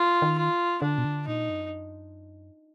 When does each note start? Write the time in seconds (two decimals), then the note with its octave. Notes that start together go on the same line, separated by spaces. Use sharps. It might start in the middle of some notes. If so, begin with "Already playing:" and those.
Already playing: F4
0.22 D#3
0.38 F4
0.82 D3 D4
0.98 B2
1.05 D3
1.27 A#2 D#4
1.49 F#2